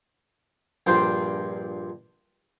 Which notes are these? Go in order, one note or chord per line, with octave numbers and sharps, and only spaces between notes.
A#1 G2 F4 C5 C6 D6